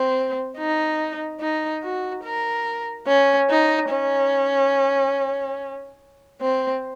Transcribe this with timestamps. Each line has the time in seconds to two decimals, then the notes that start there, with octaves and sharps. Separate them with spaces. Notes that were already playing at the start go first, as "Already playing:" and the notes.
Already playing: C4
0.58 D#4
1.41 D#4
1.83 F#4
2.24 A#4
3.07 C#4
3.50 D#4
3.90 C#4
6.41 C4